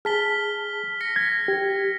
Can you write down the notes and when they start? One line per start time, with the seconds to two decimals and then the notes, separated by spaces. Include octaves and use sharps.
0.05 G#4 A5 F6 B6 G7
1.01 A#6 B6 C#7
1.16 G#6
1.48 G4